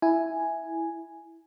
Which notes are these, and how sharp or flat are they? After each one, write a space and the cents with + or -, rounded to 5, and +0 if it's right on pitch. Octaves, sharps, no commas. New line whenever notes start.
E4 +0 G#5 +0